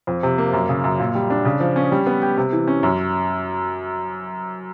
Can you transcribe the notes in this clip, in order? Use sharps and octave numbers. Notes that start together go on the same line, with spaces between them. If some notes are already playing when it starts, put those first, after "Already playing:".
F2
C3
A#3
F#2
C#3
F#2
A#2
G3
D4
C#3
F3
C#4
G3
B3
G4
C3
E3
C#4
F#2